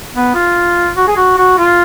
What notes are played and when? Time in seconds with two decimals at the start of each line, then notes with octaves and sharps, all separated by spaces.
0.14 B3
0.35 F4
0.96 F#4
1.07 G#4
1.16 F#4
1.38 F#4
1.58 F4